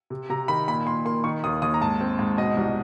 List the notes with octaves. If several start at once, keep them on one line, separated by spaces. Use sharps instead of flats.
C3
C3 A#5
D#3 B5
A#2 B5
A#2 C6
A#3 C6
D#3 C#6
D#2 D#6
D#2 D#6
A#5
G#2 A5
C4
G#2
B2 D#5
C2